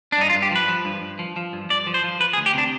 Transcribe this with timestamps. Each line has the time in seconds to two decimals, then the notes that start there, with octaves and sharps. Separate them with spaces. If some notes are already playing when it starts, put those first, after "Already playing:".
0.12 D4
0.18 G2 D#4
0.30 F4
0.34 G2
0.42 G4
0.51 F3 B4
0.68 F3
0.85 G2
1.02 G2
1.19 F3
1.36 F3
1.53 G2
1.69 G2 D5
1.87 F3
1.94 C5
2.03 F3
2.20 F3 B4
2.33 G#4
2.37 D2
2.46 G4
2.54 C3 D4